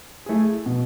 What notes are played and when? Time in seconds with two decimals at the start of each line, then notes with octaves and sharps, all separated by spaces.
0.26 A3 E4 G#4
0.66 B2